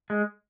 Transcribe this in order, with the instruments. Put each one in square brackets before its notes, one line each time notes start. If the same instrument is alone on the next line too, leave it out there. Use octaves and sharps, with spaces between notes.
[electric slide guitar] G#3